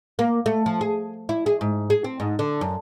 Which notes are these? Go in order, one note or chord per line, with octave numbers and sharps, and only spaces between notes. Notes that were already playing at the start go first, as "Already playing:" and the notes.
A#3
A3
F3
G#4
E4
G#4
G#2
G#4
C4
G#2
D3
F#2